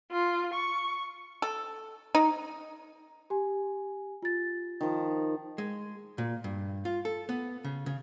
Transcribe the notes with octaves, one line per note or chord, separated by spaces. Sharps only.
F4
C#6
A4
D#4
G4 G#5
F4 A6
D#3 F3
G#3
A#2
G2
F4
A4
B3
C#3
C#3